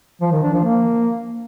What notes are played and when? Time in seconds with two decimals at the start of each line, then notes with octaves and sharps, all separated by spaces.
0.21 F3
0.32 D#3
0.43 D4
0.53 F3
0.64 A#3